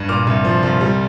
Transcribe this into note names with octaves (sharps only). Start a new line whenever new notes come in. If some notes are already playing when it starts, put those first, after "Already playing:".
Already playing: G2
A#2 D6 F6
C2
F3
C2
G3